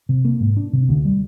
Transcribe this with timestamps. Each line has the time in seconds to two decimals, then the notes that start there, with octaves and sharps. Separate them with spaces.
0.09 C3
0.25 A#3
0.40 G#2
0.57 D4
0.73 C3
0.89 D2
1.05 G3